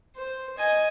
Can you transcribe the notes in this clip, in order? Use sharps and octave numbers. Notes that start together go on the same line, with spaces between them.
C5
D#5 G#5